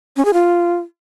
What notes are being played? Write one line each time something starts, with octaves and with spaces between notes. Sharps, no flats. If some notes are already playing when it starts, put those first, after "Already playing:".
C#4
G#4
F4